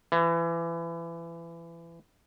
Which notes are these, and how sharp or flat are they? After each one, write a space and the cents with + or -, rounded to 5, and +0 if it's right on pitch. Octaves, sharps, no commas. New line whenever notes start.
E3 +25